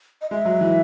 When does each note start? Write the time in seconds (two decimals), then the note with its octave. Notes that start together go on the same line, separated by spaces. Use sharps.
0.22 D#5
0.31 G#3 E5
0.45 F#3
0.61 E3